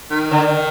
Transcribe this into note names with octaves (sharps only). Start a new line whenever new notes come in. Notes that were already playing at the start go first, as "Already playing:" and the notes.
D#3
D3